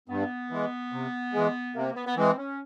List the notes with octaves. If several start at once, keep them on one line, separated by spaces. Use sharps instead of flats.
G2 B3
E3 G#3
C3
E3 G#3
C3 A#3
B3
B3
E3 G#3 C4
C#4